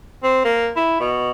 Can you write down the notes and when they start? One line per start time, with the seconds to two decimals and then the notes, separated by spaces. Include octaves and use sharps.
0.23 C4
0.45 A#3
0.76 E4
1.00 B2